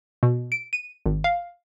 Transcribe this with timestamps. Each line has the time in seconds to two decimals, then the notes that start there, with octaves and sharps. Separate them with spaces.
0.23 B2
0.52 D7
0.73 D#7
1.06 G#1
1.24 F5